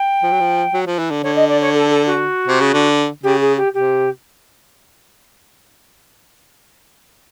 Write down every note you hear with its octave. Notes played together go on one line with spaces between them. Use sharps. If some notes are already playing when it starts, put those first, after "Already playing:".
Already playing: G5
F3
F#3
F3
F#3
F3
E3
D3
D3 C#5
D#5
D5
C#5
A4
A4
F#4
C3
C#3
D3
C#3 G4
G#4
G4
C3 G4